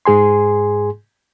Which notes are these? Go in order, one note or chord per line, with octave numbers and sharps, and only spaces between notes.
G#2 G#4 G#5 C6